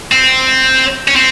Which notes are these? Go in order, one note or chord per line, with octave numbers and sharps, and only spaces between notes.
C4
C#4
C4